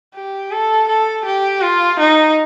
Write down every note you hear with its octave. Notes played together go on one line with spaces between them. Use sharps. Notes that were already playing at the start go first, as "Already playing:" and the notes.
G4
A4
A4
G4
F4
D#4